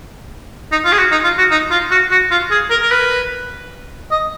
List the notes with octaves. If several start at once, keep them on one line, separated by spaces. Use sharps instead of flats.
D#4
F4
G#4
F#4
D#4
F4
F#4
D#4
F4
F#4
F#4
F4
G#4
A#4
A#4
B4
D#5